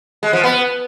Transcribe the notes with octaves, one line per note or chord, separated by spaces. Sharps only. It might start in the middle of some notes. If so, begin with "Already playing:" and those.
G#3
F3
B3